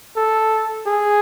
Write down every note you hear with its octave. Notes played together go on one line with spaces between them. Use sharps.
A4
G#4